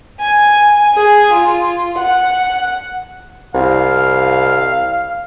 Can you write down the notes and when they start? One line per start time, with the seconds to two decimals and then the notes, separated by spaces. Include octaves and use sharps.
0.21 G#5
0.93 G#4
1.33 F4
1.98 F#5
3.55 C2 F5